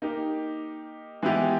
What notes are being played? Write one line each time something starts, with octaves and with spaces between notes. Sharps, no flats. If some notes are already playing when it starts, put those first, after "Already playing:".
A#3 D#4 G4
E3 G#3 B3 E4 G4